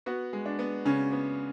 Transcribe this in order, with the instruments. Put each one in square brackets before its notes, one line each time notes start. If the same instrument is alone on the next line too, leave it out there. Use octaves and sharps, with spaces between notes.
[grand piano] B3 F#4
G#3
D4
B3
C#3 C#4
B3